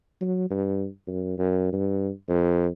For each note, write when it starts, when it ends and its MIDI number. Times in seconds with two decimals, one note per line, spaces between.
0.21 0.48 54
0.50 0.86 43
1.08 1.37 42
1.38 1.72 42
1.72 2.09 43
2.28 2.67 41